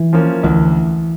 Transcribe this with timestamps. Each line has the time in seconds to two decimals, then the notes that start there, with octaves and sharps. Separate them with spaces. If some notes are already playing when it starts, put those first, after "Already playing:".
Already playing: E3
0.13 F3 A#3 C#4
0.43 D2 E3